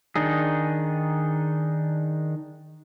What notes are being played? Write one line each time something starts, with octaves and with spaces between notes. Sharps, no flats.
D#3 D4 D#4 G#4